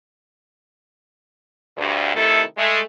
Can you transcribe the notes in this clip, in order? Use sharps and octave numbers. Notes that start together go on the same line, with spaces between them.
D2 G2
C3 D#3 A3 E4 A4
G#3 A3